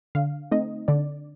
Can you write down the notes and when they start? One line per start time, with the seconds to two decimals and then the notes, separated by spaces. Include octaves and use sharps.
0.15 D3 F5
0.51 A3 C4 D#4 D#5
0.88 D3 D5